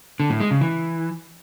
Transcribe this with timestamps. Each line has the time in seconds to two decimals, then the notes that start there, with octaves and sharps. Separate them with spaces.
0.20 D3
0.30 A2
0.40 G#3
0.51 C#3
0.61 E3